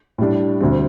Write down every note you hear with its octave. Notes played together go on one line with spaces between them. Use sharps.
A2 G3 D4
D2 D3 G3 C4